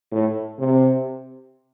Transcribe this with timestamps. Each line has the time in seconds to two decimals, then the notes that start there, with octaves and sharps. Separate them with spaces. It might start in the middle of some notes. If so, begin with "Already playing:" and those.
0.12 A2
0.59 C3